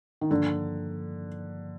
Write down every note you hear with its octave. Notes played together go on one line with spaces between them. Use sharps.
D#3
G2 D3 F3 A#3